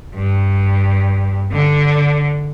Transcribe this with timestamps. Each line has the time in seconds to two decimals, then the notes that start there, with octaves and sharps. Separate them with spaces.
0.14 G2
1.52 D3